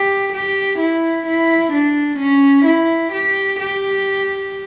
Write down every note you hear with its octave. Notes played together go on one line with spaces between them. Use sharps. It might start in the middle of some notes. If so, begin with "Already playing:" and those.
Already playing: G4
G4
E4
E4
D4
C#4
E4
G4
G4